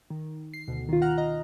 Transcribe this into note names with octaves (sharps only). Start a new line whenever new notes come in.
D#3
C7
D2 B2 C7
D#3 F4
F#5 A#5 F6 F#6
D#5 A#5